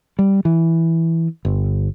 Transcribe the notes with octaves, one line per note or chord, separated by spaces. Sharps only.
G3
E3
G1